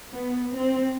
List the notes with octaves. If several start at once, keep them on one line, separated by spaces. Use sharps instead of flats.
B3
C4